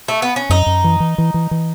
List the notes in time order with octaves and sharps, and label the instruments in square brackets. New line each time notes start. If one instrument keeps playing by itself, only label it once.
[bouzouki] A3
B3
C#4
[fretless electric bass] F#2 [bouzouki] D#4
[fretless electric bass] F#2
E3
E3
E3
E3
E3